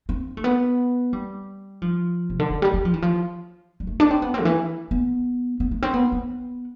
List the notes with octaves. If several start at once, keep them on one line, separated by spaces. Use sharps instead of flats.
C4
A3
B3
G3
F3
C3
D3
E3
G3
G3
F3
E3
F3
G3
A3
D4
C4
B3
C4
D3
E3
B3
B3
A3
C4
B3
B3